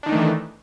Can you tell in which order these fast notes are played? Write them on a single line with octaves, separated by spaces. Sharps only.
D4 D#3 D#4 A3 E3